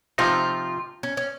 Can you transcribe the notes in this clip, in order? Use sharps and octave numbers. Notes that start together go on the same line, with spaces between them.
C3 F3 C4 D#4 F4
C#4
C#4